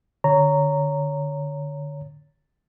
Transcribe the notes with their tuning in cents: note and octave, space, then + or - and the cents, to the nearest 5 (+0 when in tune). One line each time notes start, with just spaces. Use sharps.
D3 +15 C#5 +15 A#5 -10